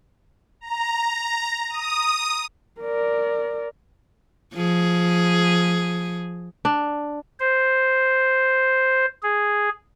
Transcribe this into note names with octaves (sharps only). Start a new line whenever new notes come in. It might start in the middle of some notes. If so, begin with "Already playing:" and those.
A#5
D#6
A#4 D5
F3 G#4
D4
C5
G#4